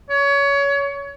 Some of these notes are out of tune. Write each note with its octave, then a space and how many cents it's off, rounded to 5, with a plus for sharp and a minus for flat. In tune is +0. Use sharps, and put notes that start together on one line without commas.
C#5 +25